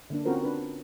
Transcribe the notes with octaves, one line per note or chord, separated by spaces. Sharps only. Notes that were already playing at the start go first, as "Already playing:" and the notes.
D3 A#3 D4
C4 C#4 F4 F#4 A#4 C5
D4 B4